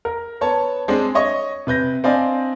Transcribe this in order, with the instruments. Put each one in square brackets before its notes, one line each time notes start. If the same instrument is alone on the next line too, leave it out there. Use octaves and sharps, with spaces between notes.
[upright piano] A#4
B3 C#5 A5
G#3 C4 D4 G#4
C#5 D#5 C#6
C3 B4 G6 A#6
C4 D4 D5 D#5 F5 G#5